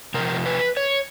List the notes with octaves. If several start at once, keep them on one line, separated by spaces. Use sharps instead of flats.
C3 F3 A#4
B4
C#5